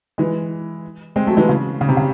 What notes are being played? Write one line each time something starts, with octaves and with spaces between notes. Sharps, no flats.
E3 G#3
G#3 C4
F#3 A3
E3 G#3
C#3
C#3
C3
C#3